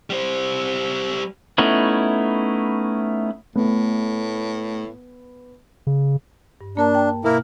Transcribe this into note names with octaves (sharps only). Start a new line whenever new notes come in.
G3 C5
A3 B3 C#4 D#4 E4
A2 A3 B3
C#3
G2
A#3 D4 A#4 A5
G5 A5
B2 A#3 E4 A#4 F6